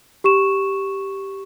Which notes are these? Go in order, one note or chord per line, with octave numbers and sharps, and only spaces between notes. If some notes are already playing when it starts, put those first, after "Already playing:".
G4 C#6 E7